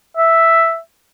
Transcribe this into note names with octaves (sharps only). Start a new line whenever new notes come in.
E5